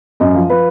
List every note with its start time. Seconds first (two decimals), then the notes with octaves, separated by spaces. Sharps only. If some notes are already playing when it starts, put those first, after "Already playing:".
0.20 F#2 D#5
0.35 F3
0.50 F3 B4